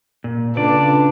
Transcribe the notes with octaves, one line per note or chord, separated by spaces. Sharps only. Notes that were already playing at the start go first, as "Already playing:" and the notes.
A#2
C#3 D4 F4 A4 B4 D5